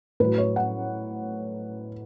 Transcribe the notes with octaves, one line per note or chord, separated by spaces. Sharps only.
A2 F#3 B4
C#5
F#5